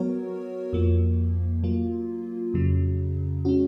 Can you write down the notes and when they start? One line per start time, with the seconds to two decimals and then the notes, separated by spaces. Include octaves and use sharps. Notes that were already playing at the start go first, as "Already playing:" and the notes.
Already playing: F#3 B3 F#4 A#4 C#5
0.73 F2 F3 A#3
1.64 F#3 A#3 F4
2.54 F2 C#3 F#3
3.45 G#3 C#4 F#4